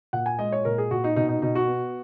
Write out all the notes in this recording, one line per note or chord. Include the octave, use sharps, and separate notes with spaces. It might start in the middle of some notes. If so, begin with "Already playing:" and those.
A#2 F#5
G#5
G#3 D#5
C#5
A#2 A#4
G#4
A#2 F#4
D#4
B2 D#4
D#4
B2 D#4
F#4
B3